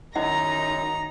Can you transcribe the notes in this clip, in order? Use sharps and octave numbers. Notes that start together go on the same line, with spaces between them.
F#2 D#3 D#4 E4 D#5 F#5 A#5